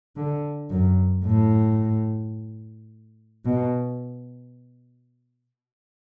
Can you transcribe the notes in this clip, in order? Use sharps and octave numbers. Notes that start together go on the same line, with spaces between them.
D3
F#2
A2
B2